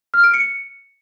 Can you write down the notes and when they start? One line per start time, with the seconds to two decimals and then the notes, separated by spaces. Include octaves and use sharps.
0.14 F6
0.24 D7
0.34 C#7